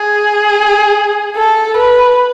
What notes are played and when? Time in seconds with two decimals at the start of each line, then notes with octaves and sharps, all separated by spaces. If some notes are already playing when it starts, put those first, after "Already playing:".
Already playing: G#4
1.36 A4
1.77 B4